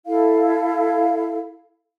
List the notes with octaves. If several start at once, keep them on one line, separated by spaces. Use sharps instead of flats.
E4 A4 F5